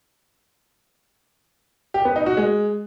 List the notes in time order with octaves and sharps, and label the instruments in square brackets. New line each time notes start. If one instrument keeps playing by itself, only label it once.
[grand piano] G4
B3
D#4
F#4
G#3